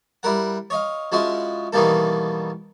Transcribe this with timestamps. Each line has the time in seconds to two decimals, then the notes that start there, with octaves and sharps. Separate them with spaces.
0.23 G3 E4 A#4 F#5
0.70 C#5 D#5 F5
1.12 F3 G#3 C#4 E4 F#4 C6
1.73 B2 D#3 E3 G3 A#3 A4